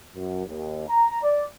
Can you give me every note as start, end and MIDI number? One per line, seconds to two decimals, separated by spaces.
0.15 0.45 42
0.47 0.85 39
0.88 1.21 82
1.22 1.44 74